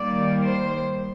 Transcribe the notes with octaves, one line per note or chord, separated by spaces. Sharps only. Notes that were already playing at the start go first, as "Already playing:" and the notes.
Already playing: D#3 G3 A#3 D5
C5